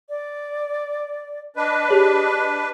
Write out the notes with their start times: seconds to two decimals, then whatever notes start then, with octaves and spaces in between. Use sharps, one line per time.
0.09 D5
1.56 D4 B4 D#5
1.88 G4 G#4 C#5